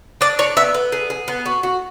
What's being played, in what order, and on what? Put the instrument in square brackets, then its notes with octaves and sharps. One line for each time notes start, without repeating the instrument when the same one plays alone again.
[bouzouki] D4 [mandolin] D5
[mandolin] C#5 [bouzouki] D5
[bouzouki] B3 [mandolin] E5
[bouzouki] B3
G#4
G#4
B3
F#4
F#4